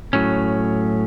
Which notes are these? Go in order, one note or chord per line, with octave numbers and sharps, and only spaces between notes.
A2 F#3 C#4